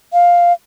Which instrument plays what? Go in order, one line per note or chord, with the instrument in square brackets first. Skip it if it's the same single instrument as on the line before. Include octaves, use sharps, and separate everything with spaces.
[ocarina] F5